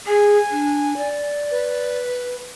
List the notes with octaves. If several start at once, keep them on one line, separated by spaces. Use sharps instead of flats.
G#4 G#5
D4
D5
B4